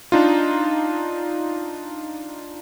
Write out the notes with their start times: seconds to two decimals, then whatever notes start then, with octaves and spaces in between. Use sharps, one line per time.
0.12 D4 D#4 F4